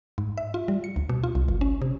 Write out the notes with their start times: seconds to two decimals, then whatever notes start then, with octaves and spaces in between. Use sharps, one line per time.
0.18 G#2
0.38 E5
0.54 F4
0.68 G3
0.84 C#7
0.96 D2
1.09 B2
1.24 F4
1.35 C2
1.48 G1
1.61 C#4
1.82 C3